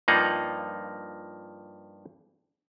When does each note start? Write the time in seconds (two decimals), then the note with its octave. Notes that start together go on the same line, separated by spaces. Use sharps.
0.08 G2 F3 A#3 D#4 F4 F#5